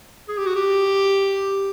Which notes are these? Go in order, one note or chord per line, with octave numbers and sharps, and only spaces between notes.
G#4
G4
F#4
G4